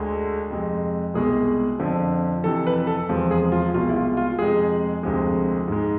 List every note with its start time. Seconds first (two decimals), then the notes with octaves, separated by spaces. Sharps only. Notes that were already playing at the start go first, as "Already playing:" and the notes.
Already playing: D2 D3 G#3
0.50 F2 C3 G#3
1.14 C2 B2 G#3 G#4
1.79 F2 D3 F3
2.44 F2 C3 E3 A4
2.67 B4
2.87 A4
3.09 E2 C3 F3 G#3
3.31 G#4
3.52 F4
3.74 C2 B2 G#3 F4
3.89 E4
3.96 F4
4.17 F4
4.39 F2 C3 G#3 G#4
5.03 D2 C3 F3 G#3
5.68 G#2 G#3